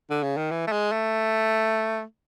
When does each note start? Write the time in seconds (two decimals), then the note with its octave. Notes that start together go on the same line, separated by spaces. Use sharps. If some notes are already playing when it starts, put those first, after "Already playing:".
0.10 D3
0.23 C#3
0.37 D#3
0.51 E3
0.67 A3
0.72 G#3
0.92 A3